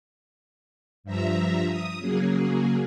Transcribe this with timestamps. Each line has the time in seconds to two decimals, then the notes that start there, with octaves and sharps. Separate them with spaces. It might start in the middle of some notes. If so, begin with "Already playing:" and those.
1.04 G2 F3 E5 A#5
1.67 D#6
1.99 C#3 F#3 A#3 G#4